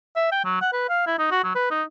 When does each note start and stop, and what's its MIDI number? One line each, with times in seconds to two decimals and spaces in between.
0.16 0.30 76
0.32 0.40 79
0.45 0.60 54
0.61 0.68 78
0.73 0.86 71
0.89 1.03 77
1.07 1.18 64
1.19 1.30 63
1.31 1.43 66
1.44 1.54 54
1.55 1.68 71
1.71 1.83 63